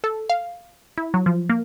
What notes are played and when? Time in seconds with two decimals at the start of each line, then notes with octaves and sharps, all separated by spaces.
0.04 A4
0.30 F5
0.98 E4
1.14 F#3
1.26 F3
1.49 A#3